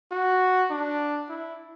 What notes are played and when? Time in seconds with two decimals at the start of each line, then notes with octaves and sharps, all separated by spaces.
0.11 F#4
0.70 D4
1.29 E4